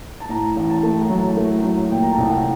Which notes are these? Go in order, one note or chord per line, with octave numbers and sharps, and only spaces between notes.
A5
A2 A#5
A1
A5
A3
F#3
A3
F#3
A#2 G5
A#5
A5
C2 G5
F#5